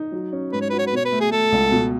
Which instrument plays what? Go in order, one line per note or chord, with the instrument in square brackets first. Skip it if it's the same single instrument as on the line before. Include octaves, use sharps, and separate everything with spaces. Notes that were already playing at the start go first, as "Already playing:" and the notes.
Already playing: [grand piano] D#4
F#3
C#4
[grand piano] G#2 [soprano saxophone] B4
[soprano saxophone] C#5
[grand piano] F#4 [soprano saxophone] B4
[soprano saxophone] C#5
B4
[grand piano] B2 [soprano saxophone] C#5
[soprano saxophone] B4
[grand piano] A3
[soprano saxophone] G#4
[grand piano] A3 [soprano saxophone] A4
[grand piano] C#2
B2